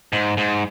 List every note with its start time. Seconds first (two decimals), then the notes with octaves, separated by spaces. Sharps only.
0.13 G#2
0.37 G#2